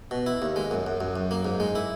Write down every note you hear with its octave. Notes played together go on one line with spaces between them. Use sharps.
B2
E4
D#2
G#3
F#2
F#2
F#2
F#2
A#3
G#2
G#3
E4